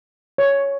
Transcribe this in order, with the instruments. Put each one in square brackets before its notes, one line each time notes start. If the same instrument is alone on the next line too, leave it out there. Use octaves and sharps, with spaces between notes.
[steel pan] C#5